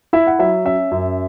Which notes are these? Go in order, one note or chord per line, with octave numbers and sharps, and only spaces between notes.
E4 E5
F#5
F#3 E5
C#4 E5
F#2